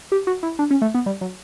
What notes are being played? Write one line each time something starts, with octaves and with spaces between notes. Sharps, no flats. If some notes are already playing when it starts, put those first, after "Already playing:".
G4
F#4
E4
D4
C#4
A3
B3
G3
F#3